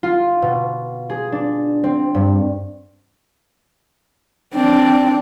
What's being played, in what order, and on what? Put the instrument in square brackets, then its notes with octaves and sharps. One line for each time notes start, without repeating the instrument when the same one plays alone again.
[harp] F4
B2
G#4
D4
C4
G2
[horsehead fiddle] C4 D4